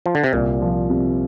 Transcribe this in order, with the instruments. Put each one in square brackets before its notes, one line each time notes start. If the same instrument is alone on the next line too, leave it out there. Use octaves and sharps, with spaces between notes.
[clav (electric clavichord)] F3
D3
C3
[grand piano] C2 [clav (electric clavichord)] A#2
[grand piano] F3
C3